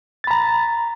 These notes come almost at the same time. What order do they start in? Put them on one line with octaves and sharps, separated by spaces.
A6 B5 A#5